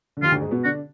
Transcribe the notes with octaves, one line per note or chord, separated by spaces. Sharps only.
D3
D#2 D#3 F4
D2 D3
G#2 G#3
B2 B3
D3 D4 F#4